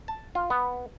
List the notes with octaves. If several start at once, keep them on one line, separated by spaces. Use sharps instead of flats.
A5
F4
B3